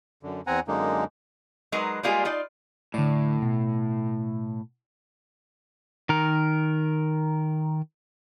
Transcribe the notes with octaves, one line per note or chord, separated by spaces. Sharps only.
F#2 D3
E2 C4 F#5 G#5 A#5
F#2 D3 G#3 A#3 D#4
F#3 G#3 D#4 A#4 B4
G3 G#3 A#3 F4 G4 G#4
D#4 F4 D5
A2 D3 D5
B2
D#3 A#4